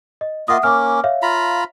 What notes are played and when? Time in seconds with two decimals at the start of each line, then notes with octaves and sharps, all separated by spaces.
0.21 D#5
0.48 A#3 F4 D#5 E5 F#5 D#6
0.63 A#3 C#4 D6 F6
1.04 C#5 E5 F5
1.22 F4 A#5 B5